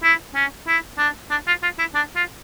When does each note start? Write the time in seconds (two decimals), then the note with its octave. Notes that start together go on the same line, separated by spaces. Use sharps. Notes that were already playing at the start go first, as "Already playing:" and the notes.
0.03 E4
0.35 C#4
0.67 E4
0.98 D4
1.31 D4
1.47 F4
1.63 F4
1.79 E4
1.95 D4
2.16 F4